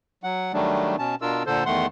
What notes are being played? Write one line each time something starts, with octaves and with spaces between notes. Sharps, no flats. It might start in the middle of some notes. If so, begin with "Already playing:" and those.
F#3 F#5
D#3 F#3 G3 A3 D4
B2 C#4 A5
B2 D4 F4 A#4 E6
A#2 D3 A4 C5
E2 D#3 A3 F#5 C6